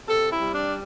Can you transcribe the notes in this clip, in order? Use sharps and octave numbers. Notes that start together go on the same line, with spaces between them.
C3 A4
E4
G3
D4